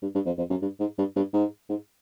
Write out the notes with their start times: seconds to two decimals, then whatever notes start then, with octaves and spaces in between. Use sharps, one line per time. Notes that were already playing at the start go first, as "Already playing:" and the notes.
0.02 G2
0.15 G2
0.25 F2
0.38 F2
0.50 F#2
0.61 G2
0.79 G#2
0.98 G2
1.16 G2
1.33 G#2
1.69 G#2